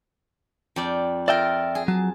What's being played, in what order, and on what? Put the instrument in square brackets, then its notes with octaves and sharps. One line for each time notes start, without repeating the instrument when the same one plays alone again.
[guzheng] F2 D5 G5
[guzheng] F4 A#4 [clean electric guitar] D5 E5 G5
[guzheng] G#4
[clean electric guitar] F#3 [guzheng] A5